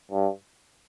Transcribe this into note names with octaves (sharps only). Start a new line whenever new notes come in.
G2